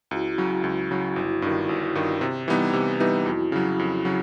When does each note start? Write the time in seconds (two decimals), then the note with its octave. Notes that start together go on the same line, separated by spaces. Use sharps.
0.11 C#2 E4 F#4
0.38 C#3 F#3
0.64 C#2
0.91 C#3 F#3
1.16 G1 E4 F#4
1.42 G2 D#3
1.69 G1
1.95 G2 D#3
2.21 C3
2.48 E3 G3 B3 D#4
2.73 C3
3.00 E3 G3 B3 D#4
3.26 F2 E4 F#4
3.52 C#3 F#3
3.79 F2
4.05 C#3 F#3